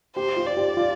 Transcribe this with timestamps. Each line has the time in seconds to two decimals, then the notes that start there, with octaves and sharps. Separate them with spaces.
0.16 G4 C5
0.36 F4
0.47 D5
0.57 G4
0.77 F4